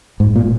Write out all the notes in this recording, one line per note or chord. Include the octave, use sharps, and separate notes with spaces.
G#2
A#2